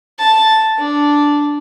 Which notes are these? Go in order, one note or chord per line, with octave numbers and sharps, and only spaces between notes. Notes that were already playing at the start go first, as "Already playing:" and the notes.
A5
D4